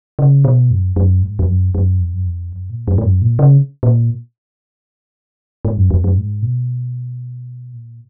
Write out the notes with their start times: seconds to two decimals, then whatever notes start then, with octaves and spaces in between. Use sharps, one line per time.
0.19 C#3
0.45 B2
0.71 F#2
0.96 F#2
1.23 G#2
1.39 F2
1.48 F#2
1.75 F#2
2.00 F2
2.14 F#2
2.26 F2
2.53 F#2
2.70 A#2
2.88 F#2
2.98 G#2
3.05 F#2
3.22 A#2
3.39 C#3
3.83 A#2
5.65 G#2
5.78 F#2
5.91 F2
6.04 F#2
6.17 G#2
6.42 B2
7.73 A#2